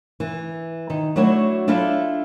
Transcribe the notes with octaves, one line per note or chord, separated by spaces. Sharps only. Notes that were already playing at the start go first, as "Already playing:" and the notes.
E3
D#3
F#3 A3 D4 E4 F#4 C#5
D4 E4 F4 A4 E5